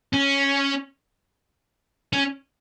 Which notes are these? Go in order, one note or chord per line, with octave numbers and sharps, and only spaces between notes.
C#4
C#4